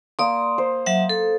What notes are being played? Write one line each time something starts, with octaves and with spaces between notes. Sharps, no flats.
A#3 D5 C6 D#6
C5
F#3 E5 F#5
A4